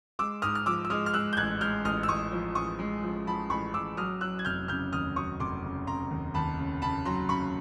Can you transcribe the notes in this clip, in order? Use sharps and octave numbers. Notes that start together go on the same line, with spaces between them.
G#3 D6 E6
G#2 D#6 F6
F6
F3 D6 E6
E6
G#3 D#6 F6
F6
G#3 E6 F#6
G6
A1 F#6 G#6
G#3 F6 G6
A1 D#6 F6
E6
A1 C#6 D#6
F3
A1 C#6 D#6
G#3
F3
F3 A5 B5
A1 B5 C#6
A1 D6 E6
F#3 D#6 F6
F#3 E6 F#6
G#6
F1 F6 G6
C#3 F6 G6
D#2 D#6 F6
F#3 C#6 D#6
F1 C6 D6
C#3
F1 A#5 C6
D#2
D#2 A5 B5
C#3
C#3 A5 B5
F#3 A#5 C6
C#3 B5 C#6